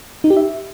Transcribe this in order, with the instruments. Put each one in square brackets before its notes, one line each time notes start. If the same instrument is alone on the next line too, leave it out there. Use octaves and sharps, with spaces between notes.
[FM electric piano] D#4
G4
E5